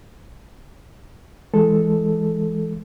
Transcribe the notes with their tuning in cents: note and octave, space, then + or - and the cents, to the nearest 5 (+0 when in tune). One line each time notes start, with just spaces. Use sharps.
E3 +0 G#3 +0 A4 +0